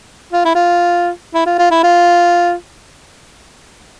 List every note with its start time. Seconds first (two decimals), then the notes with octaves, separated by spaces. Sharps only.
0.33 F4
0.45 E4
0.55 F4
1.34 E4
1.46 F4
1.59 F4
1.71 E4
1.83 F4